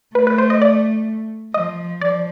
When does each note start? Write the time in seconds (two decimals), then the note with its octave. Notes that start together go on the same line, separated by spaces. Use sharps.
0.15 A3 B4
0.27 B4
0.38 C5
0.50 D#5
0.62 D5
1.54 F3 D#5
2.01 F3 D5